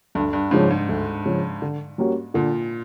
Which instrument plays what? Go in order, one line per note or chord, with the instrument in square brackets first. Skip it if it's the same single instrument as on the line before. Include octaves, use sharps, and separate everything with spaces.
[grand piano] D2 [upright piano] G2
[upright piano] G2
[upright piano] G#2 [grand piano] C#3 F3 G#3 C#4
[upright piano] G#2
[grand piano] D2
C#3 F3 G#3 C#4
D3
G3 A#3 C#4 F#4
[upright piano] A#2 [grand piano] D3